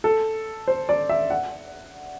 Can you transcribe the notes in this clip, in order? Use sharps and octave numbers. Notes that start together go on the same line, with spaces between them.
A4
C5
D5
E5
F#5